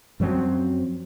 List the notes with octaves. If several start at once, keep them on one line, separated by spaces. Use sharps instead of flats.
F#2 F3 F#3 C4